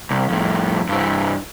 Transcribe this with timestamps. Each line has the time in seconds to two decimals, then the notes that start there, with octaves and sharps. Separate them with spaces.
0.11 C2
0.30 F2 A2
0.89 G2 E4